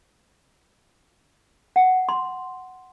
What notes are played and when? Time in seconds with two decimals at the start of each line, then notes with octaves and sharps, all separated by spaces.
1.76 F#5
2.09 C6